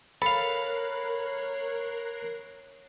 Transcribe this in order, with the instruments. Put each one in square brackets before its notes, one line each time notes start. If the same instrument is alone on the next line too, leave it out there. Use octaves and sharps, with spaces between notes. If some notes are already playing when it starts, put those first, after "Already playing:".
[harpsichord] A4 F5 [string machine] A#4 F#6 C7 [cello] C#5 [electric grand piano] B5